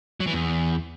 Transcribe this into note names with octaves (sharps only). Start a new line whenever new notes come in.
F#3
E3
E2